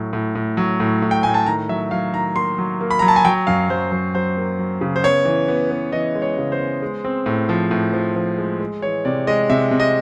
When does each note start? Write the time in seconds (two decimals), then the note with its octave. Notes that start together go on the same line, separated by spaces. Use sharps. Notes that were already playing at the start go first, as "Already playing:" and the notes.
Already playing: A2 F#3
0.13 A2
0.35 A2
0.57 F#3
0.80 A2
1.02 A2
1.11 G5
1.23 A2 G#5
1.34 A5
1.46 D#3 A#5
1.69 F#3 E5
1.91 F#3 F5
2.13 D#3 A#5
2.36 A#3 C6
2.58 F#3
2.81 A#3
2.91 B5
2.99 F#3 A#5
3.08 A5
3.16 G#5
3.25 F#3 G5
3.47 F#2 F5
3.69 F#3 C5
3.92 F#3 C5
4.14 F#3 C5
4.37 A#3
4.59 F#3
4.81 C#3
4.96 C5
5.04 B3 C#5
5.25 E3
5.48 B3
5.71 B3
5.92 E3 D#5
6.15 G#3
6.22 C#5
6.38 C#3
6.52 C5
6.60 B3
6.82 G#3
7.05 C4
7.26 A2
7.49 F3
7.71 A2
7.93 F3
8.16 F3
8.38 G#3
8.60 G#3
8.82 E3 C#5
9.05 C3 D5
9.27 G#3 D#5
9.50 C3 E5
9.71 C3
9.80 D#5